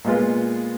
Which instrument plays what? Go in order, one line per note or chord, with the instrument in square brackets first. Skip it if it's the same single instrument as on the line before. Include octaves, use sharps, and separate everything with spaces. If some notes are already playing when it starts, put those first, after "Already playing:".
[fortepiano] A#2 G#3 B3 F4